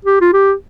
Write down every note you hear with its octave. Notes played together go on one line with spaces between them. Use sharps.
G4
F4
G4